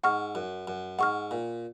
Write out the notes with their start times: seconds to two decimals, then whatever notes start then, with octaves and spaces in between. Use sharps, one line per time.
0.04 G#2 F#5 C#6 F6
0.35 F#2
0.68 F#2
0.99 G#2 F#5 C#6 F6
1.31 A#2